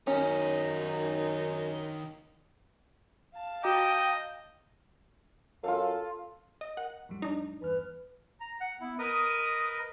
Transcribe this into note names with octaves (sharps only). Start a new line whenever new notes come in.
F#2 D#3 C#4 D#4 C#5
F5 A5
F#4 D#5 G5 A#5 D6
F#2 F4 A4 F5
D#5
A#4 F#5
F2 A2 G3
D4 D#4
E2 G2 B4 F6
A#5
F#5
B3 E4
A#4 B4 D#5 D#6